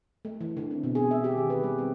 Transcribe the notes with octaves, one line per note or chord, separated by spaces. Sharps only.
A3
E3
D3
C4
B2
G#4
E5
G4
D#3
B4
G3
C4